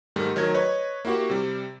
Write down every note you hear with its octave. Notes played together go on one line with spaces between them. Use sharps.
G#2 D#3 G3 A3
D#3 F#3 A3 G#6
B4 C#5 D#5
A#3 E4 F#4 G4
C3 G3